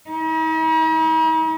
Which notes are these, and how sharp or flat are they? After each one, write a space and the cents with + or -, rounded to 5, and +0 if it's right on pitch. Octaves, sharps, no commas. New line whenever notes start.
D#4 +45